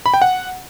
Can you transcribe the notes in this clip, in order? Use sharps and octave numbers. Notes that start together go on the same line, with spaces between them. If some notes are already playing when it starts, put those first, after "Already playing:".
B5
G5
F#5